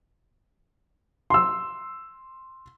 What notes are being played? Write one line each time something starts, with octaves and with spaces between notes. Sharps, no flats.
C6 E6